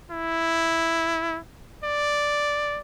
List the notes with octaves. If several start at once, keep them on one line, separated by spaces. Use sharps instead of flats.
E4
D5